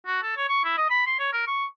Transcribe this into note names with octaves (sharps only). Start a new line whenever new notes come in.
F#4
A4
C#5
C#6
E4
D#5
B5
C6
C#5
A#4
C#6